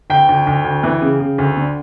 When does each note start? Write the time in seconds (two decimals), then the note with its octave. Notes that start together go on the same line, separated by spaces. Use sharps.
0.10 D2 G5
0.29 D2
0.47 D2
0.65 D2
0.83 E3
1.01 C#3
1.20 C#3
1.38 D2
1.57 D3